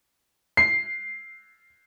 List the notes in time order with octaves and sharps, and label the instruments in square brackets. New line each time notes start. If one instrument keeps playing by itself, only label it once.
[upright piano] C7